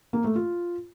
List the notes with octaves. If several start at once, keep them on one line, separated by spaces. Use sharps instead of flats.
A#3
A3
F4